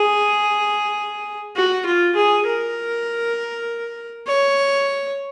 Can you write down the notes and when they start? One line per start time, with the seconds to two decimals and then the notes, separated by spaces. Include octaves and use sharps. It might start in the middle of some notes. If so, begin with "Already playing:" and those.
Already playing: G#4
1.56 F#4
1.86 F4
2.16 G#4
2.46 A#4
4.27 C#5